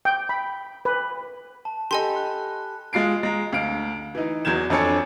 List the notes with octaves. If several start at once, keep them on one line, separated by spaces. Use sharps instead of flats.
G5
B5
B4
A5
G4 A4 D#5 G#5 B5 C6
F#6
G#3 F4 C7 D7
G#3 A#5
D2 F5 D7
E3 D#4
E2 F#3 G6 G#6 E7
F2 D4 A4 C#5 G#5 C#7